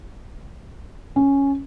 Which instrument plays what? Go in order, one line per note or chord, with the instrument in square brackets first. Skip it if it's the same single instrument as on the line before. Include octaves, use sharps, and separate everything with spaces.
[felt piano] C#4